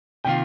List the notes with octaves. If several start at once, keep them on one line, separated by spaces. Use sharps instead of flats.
C3 D#3 A#3 F4 G5